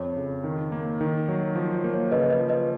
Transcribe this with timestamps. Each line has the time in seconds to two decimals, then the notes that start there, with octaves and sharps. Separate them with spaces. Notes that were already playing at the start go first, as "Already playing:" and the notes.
Already playing: F2 C#5
0.16 C#3
0.44 D#3
0.72 A#3
1.01 D#3
1.28 F#3
1.56 F3
1.74 C#5
1.84 A#3
1.94 C#5
2.11 C#3 B4 D#5
2.30 B4 D#5
2.40 F3
2.49 B4 D#5